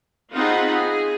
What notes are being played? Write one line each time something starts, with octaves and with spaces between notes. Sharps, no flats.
C4 D#4 F4 G#4 F#5 B5
G#4